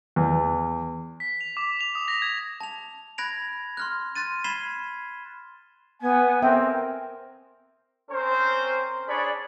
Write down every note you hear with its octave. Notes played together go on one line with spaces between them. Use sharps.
E2
B6
F7
D6
F7
D#6
A#6
G#6
A5 F7
B5 F#6 G#6 A#6 D7 F7
C6 F6 F#6
C6 F#6 A6 D#7
B5 G#6 B6 C7 E7 G7
B3 G#5
C4 A#4 E5 G5
C4 C#4 A#4 C5
D4 G#4 C#5 D5 B5